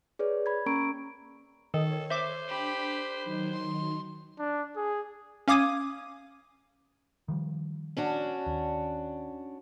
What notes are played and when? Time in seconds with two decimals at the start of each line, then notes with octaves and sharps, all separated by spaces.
0.19 G#4 B4 C#5 D5
0.46 B5 G#6
0.66 A#3 C#4 A#4 A#5 C#6 D7
1.74 D#3 A4 C#5
2.11 C5 E5 D6
2.49 D4 G4 B5
3.23 D#3 F#3 D#4
3.53 C6
4.39 D4
4.76 G#4
5.48 C#4 F5 D6 D#6 G#6 D#7
7.28 D#3 F3 G3
7.97 C#4 D4 F#4
8.46 D#2